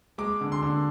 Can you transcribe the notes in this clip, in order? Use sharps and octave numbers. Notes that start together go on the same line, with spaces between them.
G#3 D6
D3
C6
D3